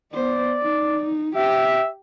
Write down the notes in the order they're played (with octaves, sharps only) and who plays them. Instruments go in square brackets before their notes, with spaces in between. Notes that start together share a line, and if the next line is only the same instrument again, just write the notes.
[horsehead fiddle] B3 C5 [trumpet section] D5
[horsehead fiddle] D#4
[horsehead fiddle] G4 [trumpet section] E5